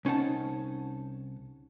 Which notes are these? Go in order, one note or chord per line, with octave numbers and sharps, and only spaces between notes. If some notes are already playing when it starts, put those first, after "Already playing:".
C2 C#4 D#4 F#5 A5